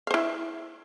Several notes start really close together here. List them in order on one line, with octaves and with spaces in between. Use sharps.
F5 C5 E4